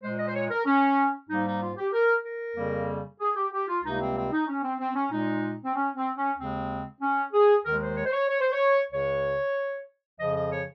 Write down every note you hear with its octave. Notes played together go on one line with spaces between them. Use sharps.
A#2 G#3 C5
D#5
C5
C#5
A#4
C#4
G#2 G3 A#3 D#4
D#4
F4
G4
A#4
A#4
F2 C#3 G3 A#3
G#4
G4
G4
F4
C#2 C3 G3 A#3 D#4
C4
C4
D#4
C#4
C4
C4
C#4
A#2 G#3 D#4
C4
C#4
C4
C#4
D#2 C#3 G#3 C4
C#4
G#4
D#2 D#3 G#3 A#4
C5
C#5
C5
C#5
C#5
C5
C#5
C#2 C#3 G#3 C#5
F2 C#3 F3 D#5
D#5
C#5